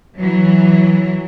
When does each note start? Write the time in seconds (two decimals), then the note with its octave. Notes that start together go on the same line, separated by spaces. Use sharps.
0.18 E3 F#3